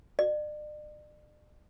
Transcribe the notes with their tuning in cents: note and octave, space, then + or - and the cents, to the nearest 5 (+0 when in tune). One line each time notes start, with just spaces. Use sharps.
D5 +40